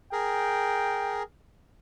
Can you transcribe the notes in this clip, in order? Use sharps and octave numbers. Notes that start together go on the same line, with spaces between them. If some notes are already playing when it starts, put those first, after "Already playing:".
G#4 A#4 G5